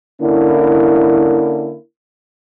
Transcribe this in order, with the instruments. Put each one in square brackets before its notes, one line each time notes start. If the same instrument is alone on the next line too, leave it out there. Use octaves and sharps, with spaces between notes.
[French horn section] D3 A#3 C#4 E4